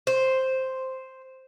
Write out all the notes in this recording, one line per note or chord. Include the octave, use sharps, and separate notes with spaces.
C5